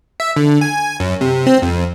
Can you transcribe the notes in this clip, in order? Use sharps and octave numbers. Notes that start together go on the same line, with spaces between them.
E5
D3
G#5
F#2
C3
C4
F2